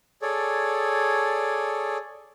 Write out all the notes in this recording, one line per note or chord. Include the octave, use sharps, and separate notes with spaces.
G#4 A4 C#5 D5